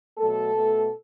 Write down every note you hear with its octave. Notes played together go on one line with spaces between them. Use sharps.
B2 F#3 A3 A4
B2 A3